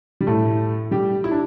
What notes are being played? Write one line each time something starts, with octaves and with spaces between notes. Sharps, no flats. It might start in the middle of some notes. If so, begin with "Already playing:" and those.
G3
A2 A3
G3 G4
E4
D4